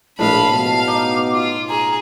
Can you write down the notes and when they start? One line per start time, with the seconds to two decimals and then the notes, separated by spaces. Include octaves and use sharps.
0.19 A#1 A2 G#3 F5 A5 B5
0.50 B2 F5
0.88 D#4 D6
1.34 F4
1.69 G#4 A#5